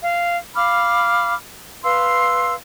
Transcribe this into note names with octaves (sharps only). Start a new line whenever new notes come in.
F5
F5 B5 D6 F6
B4 F5 C6 E6